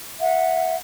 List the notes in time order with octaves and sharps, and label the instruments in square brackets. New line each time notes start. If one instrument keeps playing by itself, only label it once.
[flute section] E5 F#5